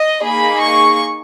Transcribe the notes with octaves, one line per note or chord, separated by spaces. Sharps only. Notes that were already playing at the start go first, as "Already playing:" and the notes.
Already playing: D#5
A#3 D#4 G#4 B5
C#6